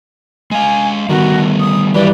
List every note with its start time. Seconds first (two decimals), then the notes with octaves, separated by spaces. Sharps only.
0.51 G#3 F5 G#5
1.09 D#3 G3 A3 B3 F#4
1.60 D#6
1.94 G2 E3 F#3 G4 D5